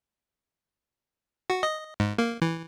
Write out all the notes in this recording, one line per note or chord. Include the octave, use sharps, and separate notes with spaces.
F#4
D#5
G#2
A#3
E3